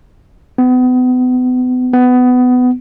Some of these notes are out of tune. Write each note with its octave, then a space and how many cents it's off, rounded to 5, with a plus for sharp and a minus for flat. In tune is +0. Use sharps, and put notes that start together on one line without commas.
B3 +35
B3 +20